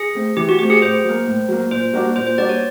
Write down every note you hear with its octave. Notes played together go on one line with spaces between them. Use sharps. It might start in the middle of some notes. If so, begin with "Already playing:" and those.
Already playing: G#4
A3 C4
E3 G4
F#4
A3 C4 G4
G#4
A2 C5
F#3 A#3
A2
F#3 A#3
A#2 C5
G3 A#3 D4 F#4
A#2 C5
C5
G3 A#3 D4 F#4 D5
C#5